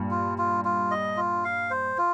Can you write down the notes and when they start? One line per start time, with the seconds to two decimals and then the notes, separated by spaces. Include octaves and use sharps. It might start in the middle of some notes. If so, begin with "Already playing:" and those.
Already playing: G2 A#2
0.11 F4
0.38 F4
0.65 F4
0.91 D#5
1.17 F4
1.45 F5
1.70 C5
1.98 F4